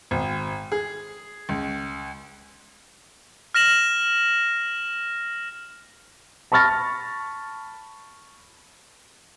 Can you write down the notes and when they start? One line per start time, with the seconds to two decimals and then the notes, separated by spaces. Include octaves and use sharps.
0.11 G#1
0.72 G#4
1.49 C#2
3.55 F6 A#6 E7 F#7
6.52 A5 B5 C#6 F6 A6 A#6